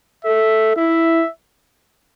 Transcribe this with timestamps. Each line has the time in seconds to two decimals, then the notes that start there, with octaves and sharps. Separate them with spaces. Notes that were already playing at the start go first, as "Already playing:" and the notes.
0.25 A4 E5
0.76 E4 E5